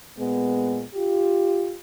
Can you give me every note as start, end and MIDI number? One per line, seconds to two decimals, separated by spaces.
0.17 0.83 46
0.17 0.83 56
0.17 0.83 59
0.95 1.75 65
0.95 1.75 67